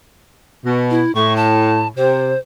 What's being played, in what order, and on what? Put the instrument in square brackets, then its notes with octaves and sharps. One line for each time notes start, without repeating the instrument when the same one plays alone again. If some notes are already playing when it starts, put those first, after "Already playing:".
[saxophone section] B2
[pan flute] E4
[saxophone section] A2 [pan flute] C#6
[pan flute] A5
[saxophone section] C3 [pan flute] C5